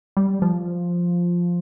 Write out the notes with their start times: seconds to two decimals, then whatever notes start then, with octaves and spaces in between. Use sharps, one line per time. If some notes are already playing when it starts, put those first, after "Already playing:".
0.17 G3
0.42 F3